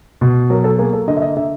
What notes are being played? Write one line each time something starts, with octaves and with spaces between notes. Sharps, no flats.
B2
F#3 A#4
A4
A#3 G#4
A4
D3 D#5
E5
D#5
D3 E5